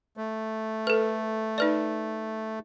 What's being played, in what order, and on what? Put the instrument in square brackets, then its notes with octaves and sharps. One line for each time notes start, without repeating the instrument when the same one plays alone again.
[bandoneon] A3
[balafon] A4 B4
D#4 B4 D5